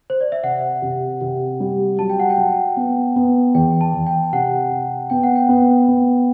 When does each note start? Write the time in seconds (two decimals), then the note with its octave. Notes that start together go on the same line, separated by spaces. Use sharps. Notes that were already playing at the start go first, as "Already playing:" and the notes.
0.10 C5
0.21 D5
0.32 E5
0.43 C3 F#5
0.82 C3
1.21 C3
1.60 G3
1.99 F#3 A5
2.10 G5
2.20 F#5
2.30 G5
2.38 F#3
2.77 B3
3.16 B3
3.54 E2 G5
3.81 A5
3.94 E2
4.07 G5
4.33 C3 F#5
4.71 C3
5.10 B3 G5
5.23 F#5
5.36 G5
5.49 B3
5.88 B3